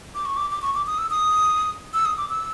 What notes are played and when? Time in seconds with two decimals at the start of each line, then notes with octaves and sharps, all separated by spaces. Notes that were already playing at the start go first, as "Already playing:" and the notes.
0.15 D6
0.25 C#6
0.37 D6
0.51 D6
0.62 C#6
0.74 D6
0.87 D#6
0.98 E6
1.11 D#6
1.94 E6
2.05 D#6
2.17 D6
2.30 E6